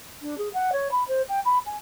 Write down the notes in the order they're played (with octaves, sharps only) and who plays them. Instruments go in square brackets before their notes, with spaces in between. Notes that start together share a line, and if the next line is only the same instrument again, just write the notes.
[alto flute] D4
G#4
F#5
C#5
B5
C5
G5
B5
G#5